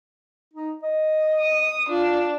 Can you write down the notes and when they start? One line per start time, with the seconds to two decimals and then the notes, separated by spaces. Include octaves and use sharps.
0.53 D#4
0.83 D#5
1.40 D#6
1.89 D4 F4